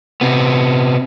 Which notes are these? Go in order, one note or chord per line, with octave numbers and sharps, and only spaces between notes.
C3 B3